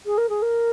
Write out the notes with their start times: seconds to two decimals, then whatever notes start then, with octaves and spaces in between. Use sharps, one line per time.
0.05 G#4
0.17 A#4
0.29 G#4
0.42 A#4